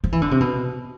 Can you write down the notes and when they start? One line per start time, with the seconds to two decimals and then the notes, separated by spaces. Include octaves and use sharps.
0.04 F3
0.12 E3
0.22 D3
0.31 C3
0.40 B2